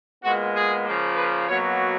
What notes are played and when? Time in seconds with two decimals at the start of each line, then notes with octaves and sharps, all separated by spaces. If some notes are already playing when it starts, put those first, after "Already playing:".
0.23 A#2 G#3 B3 F#4
0.54 G#4
0.85 C#3 F3 A#3
1.16 B4
1.48 B2 F#3 A#3 C#5